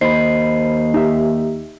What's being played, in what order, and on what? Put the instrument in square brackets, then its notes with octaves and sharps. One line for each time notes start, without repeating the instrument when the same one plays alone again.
[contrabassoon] D#2 [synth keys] C5 B5 [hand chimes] D#5 C7
[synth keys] D#4 G4 E5